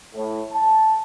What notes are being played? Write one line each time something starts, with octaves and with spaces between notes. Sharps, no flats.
A2
A5